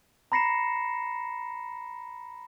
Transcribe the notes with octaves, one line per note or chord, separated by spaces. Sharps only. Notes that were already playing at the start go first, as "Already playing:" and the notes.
A#5 B5 A#6 C7 C#7 E7